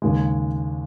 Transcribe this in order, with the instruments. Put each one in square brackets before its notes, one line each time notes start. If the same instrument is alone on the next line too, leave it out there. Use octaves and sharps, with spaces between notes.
[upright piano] D#2 C#3 G#3